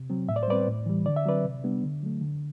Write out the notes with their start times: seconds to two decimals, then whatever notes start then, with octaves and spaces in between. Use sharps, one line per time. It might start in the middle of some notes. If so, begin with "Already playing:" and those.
Already playing: C3
0.10 F#3 C4
0.29 A2 E5
0.36 D5
0.43 C5
0.48 G3 C4 B4 D5
0.67 A2
0.86 E3 G3
1.06 D3 D5
1.16 E5
1.25 F#3 C4 B4 D5
1.44 C3
1.64 G3 B3 D4
1.83 D3
2.03 F#3 A3
2.21 D3